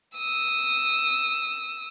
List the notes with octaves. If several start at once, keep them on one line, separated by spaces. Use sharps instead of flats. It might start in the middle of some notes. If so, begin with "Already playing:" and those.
D#6 E6